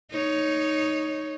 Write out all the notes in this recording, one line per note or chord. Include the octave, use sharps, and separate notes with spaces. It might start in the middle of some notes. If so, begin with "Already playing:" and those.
D#4 C#5